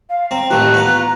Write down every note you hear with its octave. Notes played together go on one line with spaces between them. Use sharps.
F5
C4 A#5
A1 D#2 A3 A#5 F#6
B3 F4